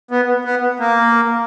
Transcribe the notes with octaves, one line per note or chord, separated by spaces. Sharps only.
B3
B3
A#3